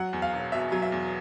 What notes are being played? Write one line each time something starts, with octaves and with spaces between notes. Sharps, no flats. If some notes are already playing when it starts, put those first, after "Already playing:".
Already playing: F#3 F#5
E2
F5
E1
B2 E5
F#3
E5
E2